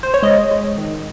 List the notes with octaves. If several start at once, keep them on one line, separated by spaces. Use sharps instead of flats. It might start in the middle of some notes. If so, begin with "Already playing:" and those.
C5
C#5
G#3 D#5
G#3
D#3